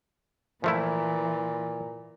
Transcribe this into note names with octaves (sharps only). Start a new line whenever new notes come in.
A#2 E3 F3 A3 E4